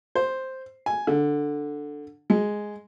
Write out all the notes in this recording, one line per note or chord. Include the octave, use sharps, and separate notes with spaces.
C5
G#5
D3
G#3